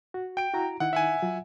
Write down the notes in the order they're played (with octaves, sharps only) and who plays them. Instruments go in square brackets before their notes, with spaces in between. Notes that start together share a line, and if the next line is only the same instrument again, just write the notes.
[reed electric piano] F#4
[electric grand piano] G5 D7
[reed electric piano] E4 F#4 A#5
[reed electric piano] D#3 D#4 E4 [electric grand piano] F#5
[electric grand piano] E5 F#5 G#5
[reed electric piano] F#3 F4